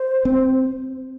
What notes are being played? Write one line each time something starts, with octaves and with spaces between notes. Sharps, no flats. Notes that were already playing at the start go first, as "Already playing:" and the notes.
Already playing: C5
C4